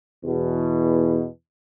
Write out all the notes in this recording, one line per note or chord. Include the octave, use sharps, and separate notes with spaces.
E2 B2